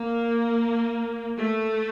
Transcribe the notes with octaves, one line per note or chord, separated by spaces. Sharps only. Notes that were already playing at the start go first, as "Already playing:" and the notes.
Already playing: A#3
A3